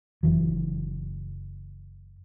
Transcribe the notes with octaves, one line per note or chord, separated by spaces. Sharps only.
F#1 E3 F#3